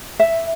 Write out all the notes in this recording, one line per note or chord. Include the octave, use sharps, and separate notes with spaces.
E5